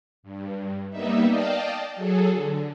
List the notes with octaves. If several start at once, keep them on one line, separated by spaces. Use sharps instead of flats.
G2
G3 A#3 B3 D#4 E5
D5 D#5 F5 G5 A5
F#3 G#4 A4
D3